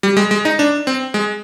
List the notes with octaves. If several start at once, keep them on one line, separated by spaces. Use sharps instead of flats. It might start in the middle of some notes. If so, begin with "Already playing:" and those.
G3
G#3
G#3
D#4
D4
C4
G#3